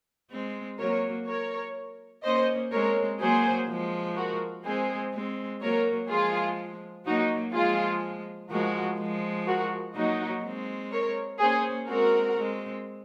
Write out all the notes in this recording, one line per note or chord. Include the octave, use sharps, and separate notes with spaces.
G#3 C4
F#3 A#3 A#4 C#5
A#4 C#5
A#3 C#4 C5 D#5
G#3 C4 A#4 C#5
F#3 A#3 G#4 C5
F3 G#3
F#4 A#4
G#3 C4 G#4 C5
G#3 C4
F#3 A#3 A#4 C#5
F3 G#3 F4 G#4
F#3 A#3 D#4 F#4
F3 G#3 F4 G#4
F3 G#3 F#4 A#4
F3 G#3
F#4 A#4
F#3 A#3 D#4 F#4
G#3 C4
A#4 C#5
A#3 C#4 G#4 C5
G#3 C4 F#4 A#4
G#3 C4